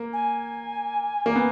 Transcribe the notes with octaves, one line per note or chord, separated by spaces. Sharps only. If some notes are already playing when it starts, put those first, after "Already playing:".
Already playing: A#3
G#5
A#3
B3